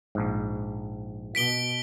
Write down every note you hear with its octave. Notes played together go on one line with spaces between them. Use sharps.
A#1 G#2
B2 B6 D7 G7